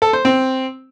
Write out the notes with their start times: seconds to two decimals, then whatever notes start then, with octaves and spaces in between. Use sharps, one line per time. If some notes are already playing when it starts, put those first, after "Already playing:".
0.02 A4
0.13 C5
0.25 C4